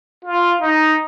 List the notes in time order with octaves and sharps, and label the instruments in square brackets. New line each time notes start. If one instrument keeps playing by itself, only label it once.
[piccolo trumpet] F4
D#4